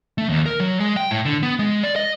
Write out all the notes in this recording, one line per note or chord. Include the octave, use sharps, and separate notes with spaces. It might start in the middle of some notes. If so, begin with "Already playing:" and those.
A3
D#2
A#4
F#3
G#3
G5
A2
D3
B3
G#3
D5
D#5